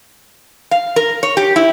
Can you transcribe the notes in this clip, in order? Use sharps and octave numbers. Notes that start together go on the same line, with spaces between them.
F5
A#4
C#5
G4
E4